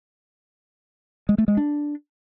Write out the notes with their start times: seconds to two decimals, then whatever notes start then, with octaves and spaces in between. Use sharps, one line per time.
1.29 G#3
1.38 A3
1.48 G#3
1.57 D4